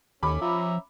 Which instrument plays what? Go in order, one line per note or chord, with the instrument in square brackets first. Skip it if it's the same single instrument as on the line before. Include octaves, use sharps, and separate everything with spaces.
[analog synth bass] D#2 [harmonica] A3 C#4 [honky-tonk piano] B5 D6
[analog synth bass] F3 [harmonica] C#4 E5 A#5